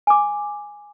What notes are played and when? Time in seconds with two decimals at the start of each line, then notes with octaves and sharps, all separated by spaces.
0.07 G#5 D6